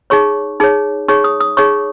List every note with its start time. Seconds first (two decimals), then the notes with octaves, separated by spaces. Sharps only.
0.10 D#4 G#4 C#5 C#6
0.60 D#4 G#4 C#5
1.08 D#4 G#4 C#5 C#6
1.24 D#6
1.40 D#6
1.57 D#4 G#4 C#5 C#6